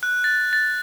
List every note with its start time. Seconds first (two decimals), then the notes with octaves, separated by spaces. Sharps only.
0.03 F#6
0.24 A6
0.53 A6